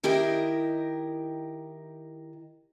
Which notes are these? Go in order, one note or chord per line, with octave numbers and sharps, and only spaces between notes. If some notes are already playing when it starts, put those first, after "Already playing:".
D#3 E4 G4 A#4 D#5 G5